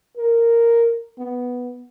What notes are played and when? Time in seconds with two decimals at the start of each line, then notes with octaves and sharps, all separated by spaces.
0.17 A#4
1.18 B3